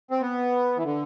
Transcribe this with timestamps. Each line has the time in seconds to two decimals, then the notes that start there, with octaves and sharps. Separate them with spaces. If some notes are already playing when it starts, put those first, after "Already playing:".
0.11 C4
0.22 B3
0.77 E3
0.84 D3